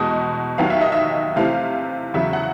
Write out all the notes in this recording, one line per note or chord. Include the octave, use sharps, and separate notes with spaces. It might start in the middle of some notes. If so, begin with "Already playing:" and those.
Already playing: E2 B2 G#3 B3 D#5
D#2 D#3 F#3 B3 F5
E5
D#5
E5
C3 E3 A3 C4 F5
E2 C#3 F#3 E5
F#5